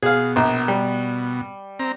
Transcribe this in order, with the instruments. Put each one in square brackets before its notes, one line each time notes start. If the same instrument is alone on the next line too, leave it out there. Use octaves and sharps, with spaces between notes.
[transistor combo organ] B2 [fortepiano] G#4 F5
[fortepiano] A#1
G3
[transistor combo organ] C4 A#5